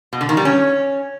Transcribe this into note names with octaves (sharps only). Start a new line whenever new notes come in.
B2
D3
D#3
G3
C#4